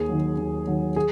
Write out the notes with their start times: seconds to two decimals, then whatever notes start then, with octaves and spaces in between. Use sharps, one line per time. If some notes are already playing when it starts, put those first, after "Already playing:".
Already playing: D#2 G#4
0.09 D#3 F#3
0.38 D#2
0.67 D#3 F#3
0.96 G#4